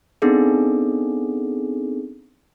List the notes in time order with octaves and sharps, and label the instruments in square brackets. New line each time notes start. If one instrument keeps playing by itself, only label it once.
[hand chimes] B3 C4 D4 D#4 G#4 A4